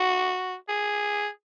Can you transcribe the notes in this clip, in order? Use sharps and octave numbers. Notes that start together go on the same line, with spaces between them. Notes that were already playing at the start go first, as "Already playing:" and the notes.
Already playing: F#4
G#4